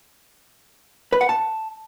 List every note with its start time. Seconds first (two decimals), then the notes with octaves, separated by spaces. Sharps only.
1.13 B4
1.21 F#5
1.29 A5